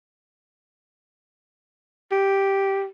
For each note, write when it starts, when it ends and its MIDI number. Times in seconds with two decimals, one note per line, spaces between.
2.12 2.86 67